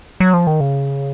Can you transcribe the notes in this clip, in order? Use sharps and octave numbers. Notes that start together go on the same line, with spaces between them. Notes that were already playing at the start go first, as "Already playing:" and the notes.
F#3
F3
D#3
C#3